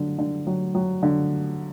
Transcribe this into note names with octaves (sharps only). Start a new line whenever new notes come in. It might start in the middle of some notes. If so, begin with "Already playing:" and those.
Already playing: D3 F#3
D3
F#3
F#3
D3